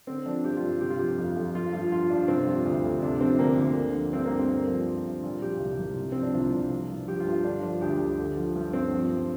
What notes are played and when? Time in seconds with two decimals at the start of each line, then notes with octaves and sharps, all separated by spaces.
0.07 D3 C4
0.26 F3 D4
0.44 G2 G4
0.57 F4
0.63 G2
0.81 C3 G4
0.90 F4
0.99 F3 G4
1.18 F2
1.36 F2
1.55 F3 F4
1.73 G2 F4
1.92 F3 F4
2.10 G2 D4
2.28 C3 C4
2.46 F3 F4
2.65 D2
2.84 D2
3.02 C3 D4
3.21 F3 C4
3.39 D2 A#3
3.57 D2
3.76 D3
3.94 F3
4.13 G2 C4
4.26 A#3
4.32 G2
4.39 C4
4.50 D3
4.68 F3
4.87 G2
5.05 G2
5.23 A#2 F4
5.42 F3 G4
5.60 C2
5.78 C2
5.98 C3
6.12 F3 C4
6.23 D4
6.34 C2 F4
6.53 C2
6.71 F3
6.90 G2
7.08 F3 G4
7.20 F4
7.26 G2
7.32 F4
7.44 D3 D4
7.63 F3 D4
7.81 D2 G4
8.00 D2
8.18 D3
8.37 F3
8.55 G2
8.73 G2 C4
8.92 F3
9.11 G2